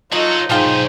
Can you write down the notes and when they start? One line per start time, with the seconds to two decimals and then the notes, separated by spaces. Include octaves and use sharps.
0.12 F#3 D#4 F4 F#4 A4 D#5
0.50 B1 G#2 F3 D#4 F4 G#4 C5 G5